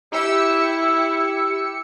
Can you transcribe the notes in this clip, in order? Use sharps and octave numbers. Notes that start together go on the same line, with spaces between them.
E4 G4 E6 C#7